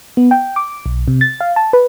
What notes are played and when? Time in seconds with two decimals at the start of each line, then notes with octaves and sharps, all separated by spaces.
0.17 B3
0.31 G5
0.56 D6
0.86 B1
1.08 C3
1.21 A6
1.41 F5
1.56 A5
1.73 B4